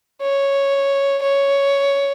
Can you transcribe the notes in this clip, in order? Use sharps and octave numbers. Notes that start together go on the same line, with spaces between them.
C#5
C#5